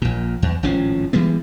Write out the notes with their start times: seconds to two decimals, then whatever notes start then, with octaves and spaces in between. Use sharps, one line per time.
0.02 A#1 A#2
0.42 E2
0.63 G#1 A2 F3 C#4
1.13 E3 G3 G#3 B3